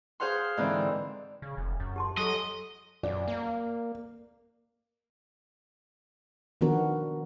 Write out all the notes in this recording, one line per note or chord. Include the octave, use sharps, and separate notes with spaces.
G#4 C5 F5 F#5 C6
G#2 D3 E3 C4 D5
C#3
F1
F#2
G4 A5 C6
F#3 G4 A4 D#5 G#5
F#2 D5
A#3
D#3 F3 B3 D4 F#4 A#4